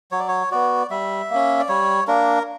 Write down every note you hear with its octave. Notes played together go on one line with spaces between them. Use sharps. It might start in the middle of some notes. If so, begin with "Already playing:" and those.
F#3 C#5
D5
C#5
B3 F#4 D5
G3 E5
A#3 C#4
D5
G3 C#5
A#3 D4 A#4